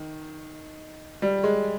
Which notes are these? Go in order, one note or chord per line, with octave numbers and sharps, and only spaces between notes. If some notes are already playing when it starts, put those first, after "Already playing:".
Already playing: D#3
G3
G#3